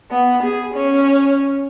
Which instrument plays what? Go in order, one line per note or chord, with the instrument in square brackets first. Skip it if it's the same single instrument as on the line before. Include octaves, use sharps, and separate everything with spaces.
[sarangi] B3
G#4
C#4